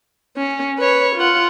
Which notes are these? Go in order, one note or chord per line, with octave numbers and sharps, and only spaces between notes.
C#4
B4 C#5
F4 F#5